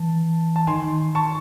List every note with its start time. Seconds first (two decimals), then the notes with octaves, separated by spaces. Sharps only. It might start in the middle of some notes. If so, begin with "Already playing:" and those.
Already playing: E3 A5
0.56 A5
0.67 D#3 G#5 C6
1.15 A5 C#6